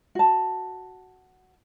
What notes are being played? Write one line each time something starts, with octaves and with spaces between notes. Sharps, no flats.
F#4 A5